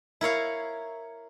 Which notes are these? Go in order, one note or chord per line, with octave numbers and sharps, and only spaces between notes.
E4 A#4 C#5 F5